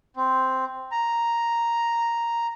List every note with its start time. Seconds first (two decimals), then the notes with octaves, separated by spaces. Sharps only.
0.16 C4
0.92 A#5